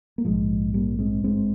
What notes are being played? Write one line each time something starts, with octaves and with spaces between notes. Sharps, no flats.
A#3
A#1 G#2 F3 G#3
G3 A#3
G#3 C4
G#1 G2 G#3 C4